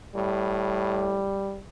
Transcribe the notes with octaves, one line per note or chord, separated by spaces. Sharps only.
A2 G3